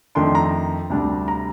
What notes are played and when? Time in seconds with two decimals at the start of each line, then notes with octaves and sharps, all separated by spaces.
0.15 F2 D#3 A3 D4 C6
0.35 A#5
0.90 D2 C3 G3 D4
1.28 A#5